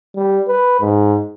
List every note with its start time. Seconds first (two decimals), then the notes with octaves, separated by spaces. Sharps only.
0.16 G3
0.48 B4
0.81 G#2